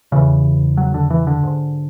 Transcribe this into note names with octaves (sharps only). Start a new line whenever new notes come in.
E2 C#3 E3
F#3
D3
E3
D3
G#2